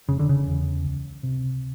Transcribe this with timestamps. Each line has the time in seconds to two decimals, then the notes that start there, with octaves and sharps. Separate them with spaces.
0.08 F1 C#3
0.19 D3
0.29 C#3
0.46 E2
0.84 C#2
1.23 C3